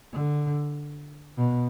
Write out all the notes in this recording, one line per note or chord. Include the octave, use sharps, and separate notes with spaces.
D3
B2